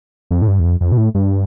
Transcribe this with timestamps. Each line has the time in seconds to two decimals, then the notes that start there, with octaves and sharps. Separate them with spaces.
0.31 F2
0.42 A2
0.48 G2
0.60 E2
0.64 F2
0.81 F2
0.92 B2
0.97 A2
1.15 G2